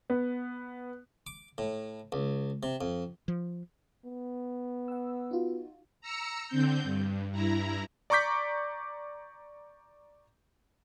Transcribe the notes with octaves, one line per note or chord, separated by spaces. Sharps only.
B3
D6
A2
C#2
C3
F2
F3
B3
F#5 E6
D#4 F4 F#4
A#5 E6 C#7
D3 C4 G6
G2
G2 E4 A#5
D5 A#5 C#6 D6 G6 B6